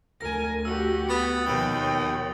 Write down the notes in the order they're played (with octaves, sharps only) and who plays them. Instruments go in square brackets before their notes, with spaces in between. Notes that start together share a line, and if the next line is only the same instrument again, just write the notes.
[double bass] D2 [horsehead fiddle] A#4 G#5 [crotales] A#6
[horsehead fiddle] F#4 G4 [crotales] E6
[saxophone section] B3 [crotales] D#6 A6 C#7
[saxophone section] D#2 [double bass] B2 F3 [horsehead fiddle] C#5 G5 [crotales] F#7